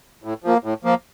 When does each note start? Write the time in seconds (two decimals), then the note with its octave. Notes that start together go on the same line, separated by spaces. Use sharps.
0.24 A2
0.44 F3 A#3
0.64 A2
0.84 F3 A#3